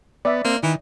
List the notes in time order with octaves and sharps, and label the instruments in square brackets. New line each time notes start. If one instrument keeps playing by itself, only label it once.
[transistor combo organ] B3 [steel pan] D5 E5
[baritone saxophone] A#3 [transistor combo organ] C4
[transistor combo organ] D#3 [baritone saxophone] E3